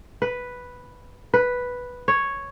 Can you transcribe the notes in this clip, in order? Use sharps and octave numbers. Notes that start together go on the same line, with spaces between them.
B4
B4
C#5